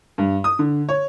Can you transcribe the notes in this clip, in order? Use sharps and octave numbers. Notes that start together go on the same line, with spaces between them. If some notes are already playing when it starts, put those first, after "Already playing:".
G2
D#6
D3
C#5